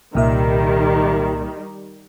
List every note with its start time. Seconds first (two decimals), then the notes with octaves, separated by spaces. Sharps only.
0.15 C2 A#2 D#3 G3 E5